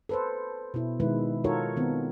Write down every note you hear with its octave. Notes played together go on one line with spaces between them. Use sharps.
A4 B4 C5
B2 E4
B2 D#3 G#3 E4 B4
D#4 F4 F#4 A4 A#4 C#5
D#3 B3 C4